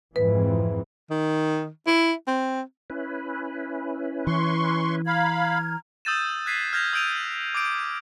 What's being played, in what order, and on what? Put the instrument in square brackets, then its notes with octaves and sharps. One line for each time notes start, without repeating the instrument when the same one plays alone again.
[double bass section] F2 G#2 E3 [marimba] B4
[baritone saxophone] D#3
E4
C4
[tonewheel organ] C#4 E4 B4
[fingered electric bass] E3 [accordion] C6 C#6
[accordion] F5 B5 [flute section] A#5 F6 G#6
[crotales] D#6 E6 G6 A6 D#7 E7
F#6 G#6 B6 C7 D#7
F6 G6 G#6 A#6 B6 F7
D#6 E6 G6 D7 D#7 F7
D6 D#6 G6 D7